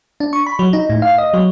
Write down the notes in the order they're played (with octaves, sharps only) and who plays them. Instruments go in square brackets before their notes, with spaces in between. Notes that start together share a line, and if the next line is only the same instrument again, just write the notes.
[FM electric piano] D4
C#6
B5
F#3
D#4
A2
F5
D#5
F#3